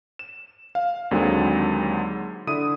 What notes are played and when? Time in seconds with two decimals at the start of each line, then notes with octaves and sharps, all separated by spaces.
0.19 E7
0.75 F5
1.11 D#2 D3 F#3 G#3 C4
2.47 D3 E4 D#6 D#7